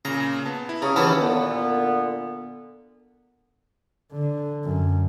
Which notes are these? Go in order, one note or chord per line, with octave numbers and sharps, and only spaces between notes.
A#2 C#3 A#5
B3 A5
E4
C#3 A#5 C#6 D#6
D#2 E3 C#4 F#5 A5 B5
A#2 D3 B3
D3
F#2